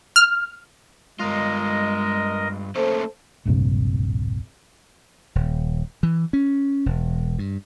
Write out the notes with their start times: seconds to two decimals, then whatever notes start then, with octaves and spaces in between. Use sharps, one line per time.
0.16 F6
1.20 G2 G#3 F4 A#4 D#5
2.75 A3 A#3 C#4 A4 C5
3.45 D1 A#1 G2 C3
5.35 D#1
6.03 E3
6.33 C#4
6.86 E1
7.39 G2